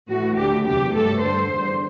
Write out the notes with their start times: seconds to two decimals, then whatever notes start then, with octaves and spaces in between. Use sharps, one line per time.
0.09 A2 E3 A3 F#4
0.37 D2 D3 A3 G4
0.65 E2 C3 F#3 G4
0.94 G2 F#3 A3 A4
1.22 G2 D3 G3 C5
1.50 E2 D3 G3